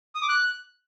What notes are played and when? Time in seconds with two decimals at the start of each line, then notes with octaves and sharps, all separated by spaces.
0.15 D#6
0.22 D6
0.29 F#6